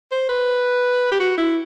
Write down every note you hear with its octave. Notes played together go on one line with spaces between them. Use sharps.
C5
B4
G4
F#4
E4